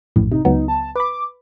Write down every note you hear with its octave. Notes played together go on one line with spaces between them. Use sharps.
A#1 F#2 A2
C3 D#4
C#2 F#3 B3 D#4
A5
B4 B5 D6